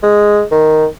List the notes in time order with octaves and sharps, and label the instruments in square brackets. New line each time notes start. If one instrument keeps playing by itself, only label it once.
[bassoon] G#3
D#3